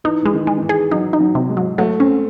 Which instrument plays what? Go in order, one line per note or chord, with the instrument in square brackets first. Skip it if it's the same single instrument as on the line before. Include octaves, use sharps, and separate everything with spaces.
[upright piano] E3 [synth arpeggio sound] D#4
[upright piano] E3 [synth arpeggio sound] G#3
[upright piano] D#3
[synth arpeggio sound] G#3
[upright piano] D#3
E3
[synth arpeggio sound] G#4
[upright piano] F#3 [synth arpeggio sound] D#4
[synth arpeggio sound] D#4
[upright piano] F#3
[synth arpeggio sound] C3
[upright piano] G#3
[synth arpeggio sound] F#3
[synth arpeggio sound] F#3 [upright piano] A3
[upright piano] C4 [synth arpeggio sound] C#4